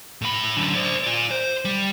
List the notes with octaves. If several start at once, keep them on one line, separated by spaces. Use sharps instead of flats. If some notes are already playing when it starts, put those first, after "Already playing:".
A2 B5
F#2 D3
C5 D5
F4 D5
C5
G3